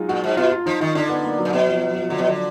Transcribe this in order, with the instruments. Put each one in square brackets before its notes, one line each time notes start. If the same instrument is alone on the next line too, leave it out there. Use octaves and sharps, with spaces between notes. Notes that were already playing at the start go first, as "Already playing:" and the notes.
Already playing: [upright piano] F#3 G#3 D#4 F4 G#4
[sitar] A#2 [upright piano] F#4
[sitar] G#2
[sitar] B2 [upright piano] F4
[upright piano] F4
[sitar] F3 [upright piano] D#4
[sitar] D#3 [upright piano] D#4
[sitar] D3 [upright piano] D4
[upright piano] B3
A#3
F#3
[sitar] A#2
[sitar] B2 [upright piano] F#3
[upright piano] F3
F#3
F3
[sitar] D3 [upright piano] F#3
[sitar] B2
D3